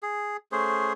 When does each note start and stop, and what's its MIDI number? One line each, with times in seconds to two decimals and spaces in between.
0.03 0.37 68
0.52 0.93 57
0.52 0.93 61
0.52 0.93 68
0.52 0.93 72